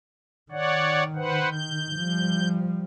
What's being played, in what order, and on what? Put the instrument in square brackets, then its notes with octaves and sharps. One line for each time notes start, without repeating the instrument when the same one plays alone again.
[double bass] D#3 [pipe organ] C#5 D5 F#5
[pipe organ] B4 C5 F#5
G6
[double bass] F3 G3